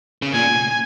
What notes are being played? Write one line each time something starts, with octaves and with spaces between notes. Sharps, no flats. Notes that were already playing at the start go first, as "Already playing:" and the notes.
C#3
A#2 G#5